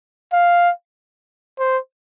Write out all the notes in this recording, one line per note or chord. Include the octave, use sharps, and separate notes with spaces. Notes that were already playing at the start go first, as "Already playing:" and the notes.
F5
C5